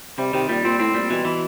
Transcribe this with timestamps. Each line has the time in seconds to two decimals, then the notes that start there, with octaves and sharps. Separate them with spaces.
0.18 C3 G3
0.33 C3 D#3
0.49 A#2 G3
0.65 A#2 C4
0.79 A2 C4
0.94 A#2 G3
1.10 B2 E3
1.25 E3